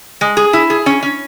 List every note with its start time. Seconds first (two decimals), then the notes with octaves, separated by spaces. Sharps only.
0.21 G#3
0.37 G#4
0.53 E4
0.70 G#4
0.86 C#4
1.03 C#4